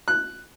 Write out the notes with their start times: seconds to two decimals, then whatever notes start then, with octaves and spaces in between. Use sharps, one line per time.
0.08 F#6